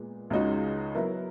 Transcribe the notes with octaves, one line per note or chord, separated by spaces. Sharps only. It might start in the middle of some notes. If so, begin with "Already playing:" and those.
Already playing: A#2 G#3 B3
C#2 C#3 G#3 D#4 F#4
F#3 B3 E4 A#4